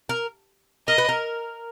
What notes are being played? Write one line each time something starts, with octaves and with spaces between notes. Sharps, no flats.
A#4
A#4 D#5
B4
A#4